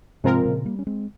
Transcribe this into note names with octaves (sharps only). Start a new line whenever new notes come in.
G#2 C3 F3 G#3 C4 F4 A#4
A#2 C#3
G3 A#3
C#4
G#3 C4